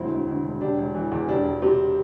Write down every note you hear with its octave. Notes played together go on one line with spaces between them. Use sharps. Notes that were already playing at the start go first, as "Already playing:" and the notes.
Already playing: E1 D2 C4 E4
D2
D2
E1
E1 D4 G4
E1
E3
E2
E1 D4 G4
E1
C3